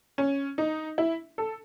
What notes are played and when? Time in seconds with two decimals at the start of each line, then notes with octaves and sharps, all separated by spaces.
0.18 C#4
0.58 D#4
0.98 E4
1.38 A4